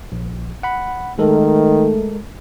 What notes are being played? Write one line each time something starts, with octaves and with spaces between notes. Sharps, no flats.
A#1
F#5 B5
D#3 G#3 A3 A4 A#4